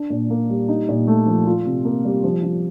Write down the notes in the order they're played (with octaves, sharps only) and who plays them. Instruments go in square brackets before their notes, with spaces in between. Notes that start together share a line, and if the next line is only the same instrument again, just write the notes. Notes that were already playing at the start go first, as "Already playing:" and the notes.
Already playing: [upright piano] D4
A#2
A#3
G3
D#4
A#2
A3
F3
F4
C3
A#3
G3
F3
F3